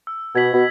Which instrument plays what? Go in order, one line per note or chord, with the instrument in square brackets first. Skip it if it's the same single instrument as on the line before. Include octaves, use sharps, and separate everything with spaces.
[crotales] E6
[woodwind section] B2 [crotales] G#6 B6 F#7
[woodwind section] B2